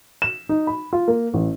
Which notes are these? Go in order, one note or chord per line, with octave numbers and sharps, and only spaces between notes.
E7
D#4
B5
F4
A#3
A1